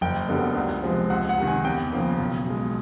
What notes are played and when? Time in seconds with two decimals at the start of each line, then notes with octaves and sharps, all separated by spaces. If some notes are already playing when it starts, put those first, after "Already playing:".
0.01 F#1 G5
0.29 F#2 D3 G3 B3
0.55 C#2
0.83 C3 F3 G#3 C4
1.10 C#2 F#5
1.29 F#5
1.38 C3 D#3
1.47 G#5
1.65 E2 G5
1.92 C#3 F3 A#3
2.20 B1
2.47 B2 G#3